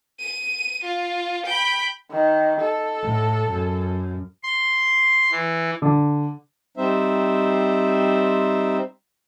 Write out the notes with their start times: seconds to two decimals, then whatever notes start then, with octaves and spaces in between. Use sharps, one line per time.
0.20 D#7
0.84 F4
1.46 G5 B5
2.11 D#3
2.61 A4
3.01 A2
3.48 F#2
4.43 C6
5.32 E3
5.82 D3
6.77 G3 C4 D#4 C5 E5